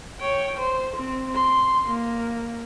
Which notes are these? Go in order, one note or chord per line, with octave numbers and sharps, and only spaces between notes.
C#5 G5
C5
C4
C6
A#3